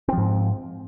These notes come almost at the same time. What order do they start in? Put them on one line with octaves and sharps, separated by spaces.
C4 F3 G#2